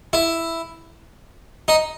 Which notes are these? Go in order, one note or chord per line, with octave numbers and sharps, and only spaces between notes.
E4
D#4